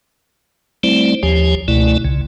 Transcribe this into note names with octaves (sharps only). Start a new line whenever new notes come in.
G3 A3 C4 E4 C5 D5
D#2 F3 G4 C#5 G#5
C#2 B2 A3 E4 D5
C2 C#3